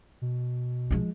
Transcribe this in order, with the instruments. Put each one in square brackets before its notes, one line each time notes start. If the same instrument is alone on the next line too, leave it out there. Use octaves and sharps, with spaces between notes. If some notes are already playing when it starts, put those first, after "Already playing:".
[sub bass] B2
[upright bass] F3 G#3